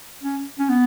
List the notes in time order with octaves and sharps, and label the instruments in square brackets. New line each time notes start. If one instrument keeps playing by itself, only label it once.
[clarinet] C#4
C#4
B3